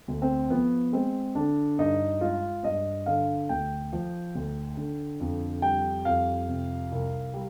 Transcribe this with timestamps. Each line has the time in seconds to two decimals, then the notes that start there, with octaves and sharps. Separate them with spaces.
0.08 D2
0.22 C4
0.50 F3 B3
0.93 G#3 C4
1.35 D3 D4
1.79 G2 D#4
2.21 G#3 F4
2.63 G2 D#5
3.06 D3 F5
3.49 D2 G5
3.93 F3
4.35 D2
4.77 D3
5.20 F2
5.62 G3 G5
6.05 F2 F5
6.48 C3
6.92 C2
7.34 G3